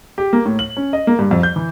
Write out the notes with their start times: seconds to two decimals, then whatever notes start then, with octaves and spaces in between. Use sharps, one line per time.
0.18 G4
0.33 A#3
0.46 A2
0.59 F#7
0.77 C#4
0.93 D#5
1.07 A#3
1.19 G2
1.31 F2
1.43 G6
1.56 E3